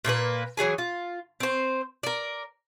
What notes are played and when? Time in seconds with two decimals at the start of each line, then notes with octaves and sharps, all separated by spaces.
0.05 A#2 A#3 D4 B4
0.57 E3 F#3 G#4 G#5
0.78 F4
1.40 C4 C5
2.03 A#4 D5